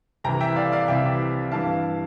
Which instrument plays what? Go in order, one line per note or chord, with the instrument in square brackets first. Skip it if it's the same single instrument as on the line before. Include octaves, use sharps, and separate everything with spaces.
[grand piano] C2 C3 E3 G5 A#5
E5 G5
D5 F5
D5 F5
C2 C3 E3 E5 G5
G2 E3 F5 A5